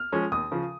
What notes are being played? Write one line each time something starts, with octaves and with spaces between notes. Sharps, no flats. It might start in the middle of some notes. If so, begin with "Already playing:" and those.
Already playing: F6
F3 G#3 C#4
D#2 D#6
C#3 F3